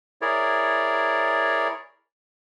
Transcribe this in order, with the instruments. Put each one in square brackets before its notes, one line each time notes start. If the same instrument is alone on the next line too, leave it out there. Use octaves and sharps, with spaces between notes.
[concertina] E4 G#4 A#4 C#5 D5